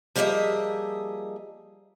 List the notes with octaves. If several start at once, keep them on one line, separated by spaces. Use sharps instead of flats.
F3 G3 A#3 G#4 D#5 E5